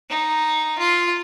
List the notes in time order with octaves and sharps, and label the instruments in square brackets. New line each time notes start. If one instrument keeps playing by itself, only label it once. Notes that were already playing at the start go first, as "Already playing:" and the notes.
[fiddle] D#4
F4